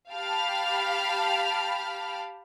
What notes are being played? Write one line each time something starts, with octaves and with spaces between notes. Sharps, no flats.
G4 F5 G5 A5 B5 F6